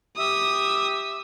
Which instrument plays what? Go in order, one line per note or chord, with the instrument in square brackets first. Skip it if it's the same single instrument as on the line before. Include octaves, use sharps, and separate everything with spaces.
[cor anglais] G4 [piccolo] E5 [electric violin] D#6